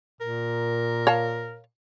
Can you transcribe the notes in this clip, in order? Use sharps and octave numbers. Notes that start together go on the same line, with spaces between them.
A#2 A#4
C#5 F5 A5